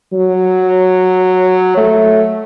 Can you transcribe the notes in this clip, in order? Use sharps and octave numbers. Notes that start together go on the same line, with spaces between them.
F#3
A3